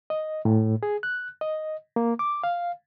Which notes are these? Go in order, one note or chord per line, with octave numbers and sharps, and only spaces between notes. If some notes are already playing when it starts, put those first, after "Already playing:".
D#5
A2
G#4
F#6
D#5
A#3
D6
F5